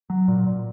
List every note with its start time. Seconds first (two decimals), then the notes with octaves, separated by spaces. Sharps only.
0.10 F#3
0.28 A#2
0.47 A#2